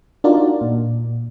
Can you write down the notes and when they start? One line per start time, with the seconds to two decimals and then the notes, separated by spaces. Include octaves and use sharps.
0.24 D4 D#4 F4 F#4 A#4 D5
0.61 A#2